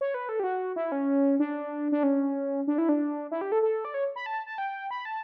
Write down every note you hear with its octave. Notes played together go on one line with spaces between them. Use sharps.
C#5
B4
A4
G4
F#4
E4
C#4
D4
D4
C#4
D4
E4
D4
E4
G4
A4
A4
D5
C#5
B5
A5
A5
G5
B5
A5